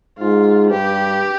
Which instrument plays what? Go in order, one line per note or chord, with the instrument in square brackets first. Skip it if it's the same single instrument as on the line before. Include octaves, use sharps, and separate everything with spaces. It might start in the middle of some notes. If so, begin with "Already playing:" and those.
[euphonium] G#2 [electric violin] F4
[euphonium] G2 [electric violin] G4